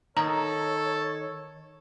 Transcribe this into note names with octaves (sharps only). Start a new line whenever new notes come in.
D#3 A4 C#5 D#5 A#5